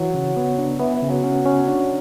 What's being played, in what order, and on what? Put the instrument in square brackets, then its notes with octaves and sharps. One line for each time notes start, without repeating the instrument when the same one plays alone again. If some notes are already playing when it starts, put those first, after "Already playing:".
Already playing: [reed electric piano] E3 [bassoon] F#3
[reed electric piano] C#3
B3
D4
[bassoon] E3 [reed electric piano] B3
[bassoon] E3
[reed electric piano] C#3
[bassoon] F#3
[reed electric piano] C#4
C#4
D4